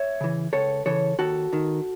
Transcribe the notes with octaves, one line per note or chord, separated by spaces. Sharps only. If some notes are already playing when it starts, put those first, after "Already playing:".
Already playing: C#5 E5
C#3 E3
C#2 A4 C#5
C#3 E3 A4 C#5
D#2 F#4 A4
D#3